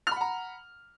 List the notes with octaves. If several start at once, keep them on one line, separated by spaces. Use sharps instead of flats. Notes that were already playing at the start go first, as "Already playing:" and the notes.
F#5 A#5 B5 F6